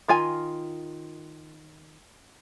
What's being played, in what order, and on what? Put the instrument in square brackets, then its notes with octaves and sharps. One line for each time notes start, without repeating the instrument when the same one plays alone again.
[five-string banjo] D#3 F4 G#5